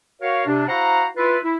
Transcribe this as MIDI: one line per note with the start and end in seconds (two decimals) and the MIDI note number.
0.21 0.46 66
0.21 0.46 70
0.21 0.46 73
0.21 0.46 77
0.47 0.68 48
0.47 0.68 62
0.68 1.06 64
0.68 1.06 66
0.68 1.06 72
0.68 1.06 77
0.68 1.06 78
0.68 1.06 82
1.17 1.38 64
1.17 1.38 65
1.17 1.38 71
1.43 1.56 64